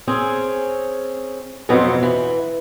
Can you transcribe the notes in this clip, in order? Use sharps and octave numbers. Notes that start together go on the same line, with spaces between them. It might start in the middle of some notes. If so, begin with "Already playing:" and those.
C4 C#4 G#4
F2 B2 F#3 B3 C4 F4
E3